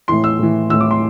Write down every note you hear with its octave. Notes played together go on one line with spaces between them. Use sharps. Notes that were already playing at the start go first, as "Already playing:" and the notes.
A2 E3 C6
E6
A2 E3
A2 E3 E6
D6
C6